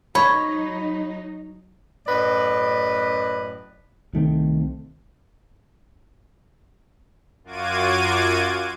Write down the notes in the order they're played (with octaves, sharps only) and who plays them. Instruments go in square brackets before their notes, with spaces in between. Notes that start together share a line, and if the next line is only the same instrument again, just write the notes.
[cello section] F#3 D#4 [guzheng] C#5 [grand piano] B5
[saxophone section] F#2 A2 B4 D5 D#5
[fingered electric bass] C2 D#3 A3 C4
[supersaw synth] F#2 F4 F#4 D6 G#6 D#7